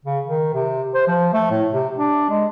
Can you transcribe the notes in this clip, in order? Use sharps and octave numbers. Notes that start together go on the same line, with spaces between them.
C#3
D#3
C3
C5
F3
A3
A2
C3
D4
G#3